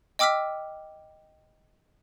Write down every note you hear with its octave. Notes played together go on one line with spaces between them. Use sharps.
D#5 G5 D6 E6 F6 B6